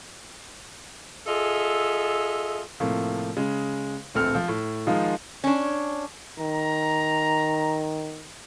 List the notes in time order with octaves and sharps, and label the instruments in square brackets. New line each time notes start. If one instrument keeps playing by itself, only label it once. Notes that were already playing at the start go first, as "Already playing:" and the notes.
[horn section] F4 G#4 A4 D#5 E5
[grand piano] A2 C3 F3 A#3
C#3 G#3
D1 A#1 C4 A4 F6
F3
A2
D#3 F3 G#3 D#4 F4
[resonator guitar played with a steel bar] C#4 D4
[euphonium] D#3 [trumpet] A#5